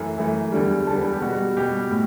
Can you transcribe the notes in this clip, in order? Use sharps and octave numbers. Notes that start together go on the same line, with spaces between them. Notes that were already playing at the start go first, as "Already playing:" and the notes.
Already playing: F#2 E3 A3
F#2 E3 A3
E2 D3 G3
E2 D3 G3 A5
B4
A4
G4
B2 G3 F#4
B2 G3 G4
A2